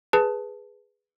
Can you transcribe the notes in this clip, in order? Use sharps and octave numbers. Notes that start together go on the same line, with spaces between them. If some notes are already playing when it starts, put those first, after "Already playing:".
G#4 B4 A5